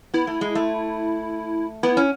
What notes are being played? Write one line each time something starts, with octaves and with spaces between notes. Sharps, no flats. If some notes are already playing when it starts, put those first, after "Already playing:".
B3 E4
A3
G#3
A3
B3 E4
C#4